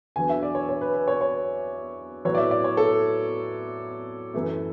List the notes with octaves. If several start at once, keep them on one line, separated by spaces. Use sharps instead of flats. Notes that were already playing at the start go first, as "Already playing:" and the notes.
E2 D3 F#3 B3 G#5
E5
D5
C#5
C#5
B4
B4
C#5
C#5
A2 F#3 B3 C#5
D5
E5
D5
C#5
A4
F#2 E3 A3